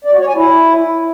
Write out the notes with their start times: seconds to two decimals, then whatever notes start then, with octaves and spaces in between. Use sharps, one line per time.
0.05 D5
0.12 F#4
0.20 C#5
0.28 G#5
0.35 E4